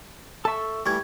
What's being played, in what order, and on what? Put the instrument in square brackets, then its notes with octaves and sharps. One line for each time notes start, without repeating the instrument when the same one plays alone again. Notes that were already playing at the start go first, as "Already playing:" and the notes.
[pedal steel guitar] A4 C#6 [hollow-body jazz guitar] E5 A5
[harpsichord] E3 G3 [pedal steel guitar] A3 [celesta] C#6 G#6